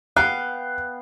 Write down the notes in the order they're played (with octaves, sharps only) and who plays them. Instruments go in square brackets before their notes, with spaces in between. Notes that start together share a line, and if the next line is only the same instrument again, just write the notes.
[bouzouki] B3 F5 G5 [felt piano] F#6